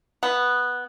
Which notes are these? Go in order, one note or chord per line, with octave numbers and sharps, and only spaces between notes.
B3